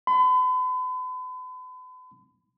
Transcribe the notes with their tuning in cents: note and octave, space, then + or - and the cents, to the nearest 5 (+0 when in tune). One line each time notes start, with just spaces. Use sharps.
B5 +40